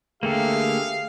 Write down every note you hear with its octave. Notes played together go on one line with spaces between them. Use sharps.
D3 A3 A#3 G4 G#4 E5 F5